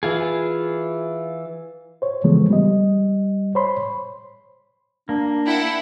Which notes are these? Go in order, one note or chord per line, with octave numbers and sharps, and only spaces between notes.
E3 F4 G#4
C5 C#5
C#3 E3 F3 G#3 A3 B3
G3 D#5
C5 C#5 B5 C6
A#3 D4
E4 F#5 G5